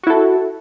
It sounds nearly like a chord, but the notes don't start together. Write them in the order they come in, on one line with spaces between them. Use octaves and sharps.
F#4 E4 A4